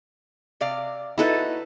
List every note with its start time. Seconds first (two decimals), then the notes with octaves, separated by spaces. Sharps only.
0.61 C3 D5 F5
1.18 D#4 E4 F#4 A4 B4